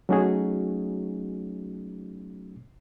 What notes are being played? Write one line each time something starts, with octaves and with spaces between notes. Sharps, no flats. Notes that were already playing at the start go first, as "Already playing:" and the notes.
F#3 A3 C#4 D#4 F#4 G#4